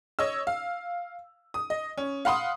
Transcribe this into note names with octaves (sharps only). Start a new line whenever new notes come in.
C#5 D#5 E6
F5
D#6
D#5
C#4
F5 F#5 B5 C6 D#6